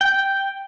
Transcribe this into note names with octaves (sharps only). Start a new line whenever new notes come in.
G5